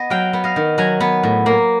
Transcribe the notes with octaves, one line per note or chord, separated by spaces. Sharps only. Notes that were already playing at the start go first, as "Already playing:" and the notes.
Already playing: B3 D#5
F#3 F5 G5
B3
D#5 F5
D#3
F#3 G#5 A#5
B3
A2
A#3